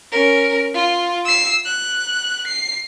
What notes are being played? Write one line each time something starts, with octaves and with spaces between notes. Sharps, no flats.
C#4 A#4
F4
E6 C7
F#6
C7